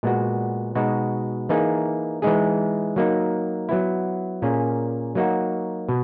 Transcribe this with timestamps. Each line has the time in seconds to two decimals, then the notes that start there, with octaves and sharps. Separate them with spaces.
0.03 A#2 G#3 B3 F#4
0.75 B2 G#3 D#4 F#4
1.49 E3 A#3 D#4 G#4
2.22 E3 G#3 D#4 G#4
2.96 F#3 A#3 D#4
3.69 F#3 B3 E4
4.42 A#2 A#3 C#4 G#4
5.15 F#3 A#3 D#4 F#4
5.89 B2